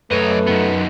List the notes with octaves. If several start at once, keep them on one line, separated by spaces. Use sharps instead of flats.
F#2 A3 B4 C#5 D#5
D#3 B3